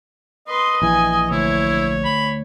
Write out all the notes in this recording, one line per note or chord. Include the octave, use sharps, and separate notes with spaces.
B4 D#5 C6
A#1 E3 G#5
D2 E4 C#5
B5